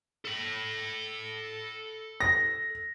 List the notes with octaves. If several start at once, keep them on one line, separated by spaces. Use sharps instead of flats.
A4 B5
A#6